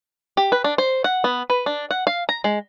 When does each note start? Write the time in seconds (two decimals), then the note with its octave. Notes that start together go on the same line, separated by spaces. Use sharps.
0.37 G4
0.52 B4
0.64 D4
0.78 C5
1.04 F#5
1.24 B3
1.50 B4
1.66 D4
1.91 F#5
2.07 F5
2.29 A#5
2.44 G#3